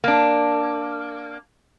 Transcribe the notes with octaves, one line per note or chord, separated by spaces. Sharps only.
A#3 D4